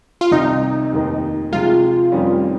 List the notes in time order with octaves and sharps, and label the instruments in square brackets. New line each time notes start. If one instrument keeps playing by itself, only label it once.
[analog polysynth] F4
[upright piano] C2 C3 D#3 [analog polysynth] D#4
[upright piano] F1 D#2 D#3
[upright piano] C3 F3 G#3 [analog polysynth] F4
[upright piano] F1 F2 D#3 G3 C#4